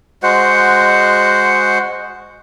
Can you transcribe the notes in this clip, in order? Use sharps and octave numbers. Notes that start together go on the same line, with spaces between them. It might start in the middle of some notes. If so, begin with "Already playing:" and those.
G#3 F#4 C5 F#5